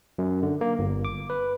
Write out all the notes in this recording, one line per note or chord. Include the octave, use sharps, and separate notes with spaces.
F#2
D3
A#3
G1
D6
B4